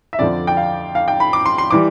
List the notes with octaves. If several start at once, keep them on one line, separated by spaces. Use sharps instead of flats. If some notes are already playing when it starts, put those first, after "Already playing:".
E5
F2 D3 F3 D5
G5
F5
F5
G5
B5
D6
C6
C6
E3 G3 D6